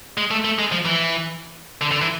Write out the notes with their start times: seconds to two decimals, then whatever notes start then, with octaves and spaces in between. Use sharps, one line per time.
0.17 G#3
0.31 A3
0.45 A3
0.59 G#3
0.72 F3
0.85 E3
1.81 D3
1.92 D3
2.01 E3